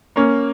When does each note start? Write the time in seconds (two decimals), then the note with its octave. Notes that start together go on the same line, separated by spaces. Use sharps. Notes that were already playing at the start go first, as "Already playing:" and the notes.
0.16 A#3 C#4